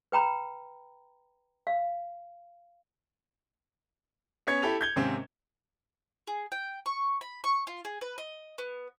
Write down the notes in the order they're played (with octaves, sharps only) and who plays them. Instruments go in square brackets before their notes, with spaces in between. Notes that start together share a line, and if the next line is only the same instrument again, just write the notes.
[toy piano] B4 G5 A#5 B5
F5
[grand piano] B3 C#4 C#5 G#6 C#7
E4 G4 A4 F7
G6 G#6 G7
G#2 C3 D#3 A#3 C4 C#4
[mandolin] G#4
G5
C#6
B5
C#6
F4
G#4
B4
D#5
B3